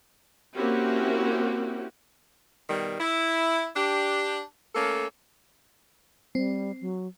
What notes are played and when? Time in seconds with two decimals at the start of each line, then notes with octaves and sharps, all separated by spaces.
0.53 A#3 C4 C#4 E4 F#4 G4
2.68 B2 D#3 G3
2.99 E4
3.75 D4 G4
4.75 A3 A#3 C#4 A4
6.35 G3 C4
6.81 F#3